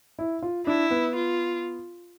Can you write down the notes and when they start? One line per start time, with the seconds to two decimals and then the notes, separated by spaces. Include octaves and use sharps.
0.19 E4
0.42 F4
0.66 D4 E4
0.91 B3
1.15 F4